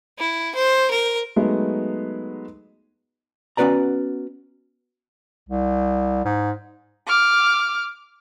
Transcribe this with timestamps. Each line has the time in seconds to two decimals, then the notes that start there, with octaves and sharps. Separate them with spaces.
0.19 E4
0.55 C5
0.91 A#4
1.36 F#3 G#3 A3 B3 D#4 D#5
3.57 B3 C#4 F#4 B4 D5 A#5
5.49 C2
6.25 G#2
7.07 D6 F6